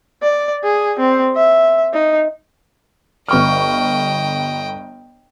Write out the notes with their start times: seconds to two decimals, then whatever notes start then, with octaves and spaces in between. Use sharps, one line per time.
0.22 D5
0.64 G#4
0.99 C4
1.36 E5
1.94 D#4
3.28 G1 D#5 G5 C#6 F6